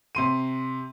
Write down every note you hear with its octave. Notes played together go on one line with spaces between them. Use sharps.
C3 C6 D#7